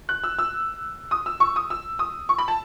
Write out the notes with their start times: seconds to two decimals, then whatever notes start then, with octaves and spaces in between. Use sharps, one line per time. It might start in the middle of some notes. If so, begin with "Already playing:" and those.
0.09 F#6
0.24 E6
0.39 E6
1.11 D#6
1.26 E6
1.40 C#6
1.56 D#6
1.70 E6
1.99 D#6
2.29 C#6
2.38 B5
2.48 A5